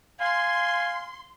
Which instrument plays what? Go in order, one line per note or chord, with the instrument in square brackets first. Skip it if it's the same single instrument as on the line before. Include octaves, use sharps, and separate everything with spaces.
[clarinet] F5 [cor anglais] G#5 [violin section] C6